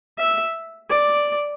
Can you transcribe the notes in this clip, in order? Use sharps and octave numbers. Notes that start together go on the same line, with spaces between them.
E5
D5